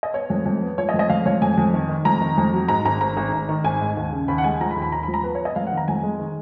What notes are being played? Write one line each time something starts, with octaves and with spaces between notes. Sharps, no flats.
D#5
B3 C#5
F2
F2
B3
F3 C#5
D#5
F2
D#5
F2 F5
F2 C#5
F2 G#5
F2
D#3
D#3
F2 A#5
D#3
F2
F#3
G#2 A#5
G#1 A#5
G#1 A#5
G#1
G#1
D#3
G#1 G#5
G#2
D#2
C#3
D#2 B5
F#5
G#3 G#5
F3 A#5
B5
D#2
B5
D#2 A#5
B5
F3
A#5
B3 B4
C#5
B3 D#5
F2 F5
F#5
D#3
A#5
F2 G#5
G#3
D#3